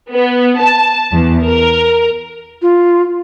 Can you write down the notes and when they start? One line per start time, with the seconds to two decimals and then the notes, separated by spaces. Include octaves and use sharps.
0.11 B3
0.60 A5
1.11 E2
1.45 A#4
2.62 F4